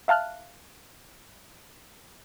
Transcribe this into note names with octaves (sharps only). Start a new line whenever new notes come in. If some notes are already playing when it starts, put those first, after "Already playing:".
E5 F5 A5 F6 F#6